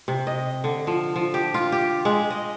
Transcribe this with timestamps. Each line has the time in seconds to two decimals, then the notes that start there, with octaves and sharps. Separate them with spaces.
0.08 C3
0.27 D#5
0.64 D3
0.87 F3
1.16 F3
1.34 G4
1.54 F4
1.72 G4
2.05 G#3
2.30 D#5